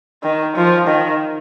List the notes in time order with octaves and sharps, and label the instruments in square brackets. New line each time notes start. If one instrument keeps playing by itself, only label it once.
[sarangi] D#3
F3
D#3